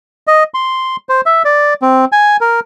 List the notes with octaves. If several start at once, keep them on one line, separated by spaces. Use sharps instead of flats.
D#5
C6
C5
E5
D5
C4
G#5
A#4